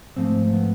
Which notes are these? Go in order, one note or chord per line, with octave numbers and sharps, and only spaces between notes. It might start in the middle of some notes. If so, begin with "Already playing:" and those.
G#2 F3 A3 C4
B3